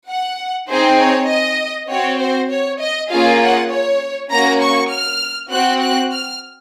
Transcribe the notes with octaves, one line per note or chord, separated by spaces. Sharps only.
F#5
C4 D#4 G#4 C5
C#5
D#5
C4 F#4 C#5
C5
C#5
D#5
A#3 C#4 F4 G#4 F5
F#5
C#5
A#3 C#4 F#4 A#5
C#6
F6
C4 F#4 F#6
F#6
F6